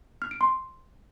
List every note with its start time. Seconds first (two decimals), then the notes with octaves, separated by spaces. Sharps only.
0.22 F6
0.31 D7
0.41 C6